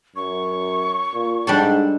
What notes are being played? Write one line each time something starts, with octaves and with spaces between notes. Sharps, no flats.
F#2 C#6
A#2
G#2 G3 D4 A4